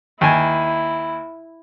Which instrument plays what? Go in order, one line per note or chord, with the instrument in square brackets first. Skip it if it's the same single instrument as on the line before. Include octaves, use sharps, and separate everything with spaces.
[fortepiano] D#2 G#5 [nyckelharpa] E4